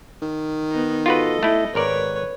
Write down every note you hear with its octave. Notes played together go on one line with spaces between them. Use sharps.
D#3
B3 D#4
F4 F#4 A4 B4 D#5
A3 E4
G#1 A#4 B4 C#5 D5